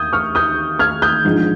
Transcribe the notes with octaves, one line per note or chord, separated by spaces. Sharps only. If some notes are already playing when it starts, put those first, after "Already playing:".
Already playing: D#2 D#3 D#6 G6 G#6
C#6 F6
D#6 G6
F6 G#6
D#6 G6
A#1 G#2 F3